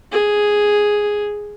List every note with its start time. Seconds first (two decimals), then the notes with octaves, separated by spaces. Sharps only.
0.12 G#4